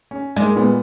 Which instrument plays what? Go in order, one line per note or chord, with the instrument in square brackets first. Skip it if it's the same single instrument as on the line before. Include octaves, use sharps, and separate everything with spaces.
[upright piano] C#4
[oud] G#3 [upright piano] A#3 D5
[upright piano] A#2 B3